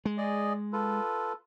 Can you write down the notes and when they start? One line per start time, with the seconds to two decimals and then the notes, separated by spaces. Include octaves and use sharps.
0.05 G#3
0.18 G#4 D5 D#5
0.73 F4 A4 B4